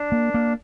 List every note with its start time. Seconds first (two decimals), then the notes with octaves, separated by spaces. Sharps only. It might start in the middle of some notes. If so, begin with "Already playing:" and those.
Already playing: D4
0.12 A#3
0.34 A#3